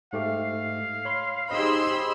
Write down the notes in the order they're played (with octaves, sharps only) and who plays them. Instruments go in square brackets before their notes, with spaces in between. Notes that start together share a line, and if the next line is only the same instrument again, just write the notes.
[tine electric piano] G#2 A3 G4 [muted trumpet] F5
[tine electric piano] C#5 B5 C6
[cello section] D#4 G4 G#4 [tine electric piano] C5 D#5 [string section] B5 C6 E6